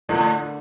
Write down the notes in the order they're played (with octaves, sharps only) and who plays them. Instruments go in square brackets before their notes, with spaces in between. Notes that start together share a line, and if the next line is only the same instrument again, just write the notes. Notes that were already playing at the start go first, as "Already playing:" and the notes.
[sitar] A2 [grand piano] D3 A3 D4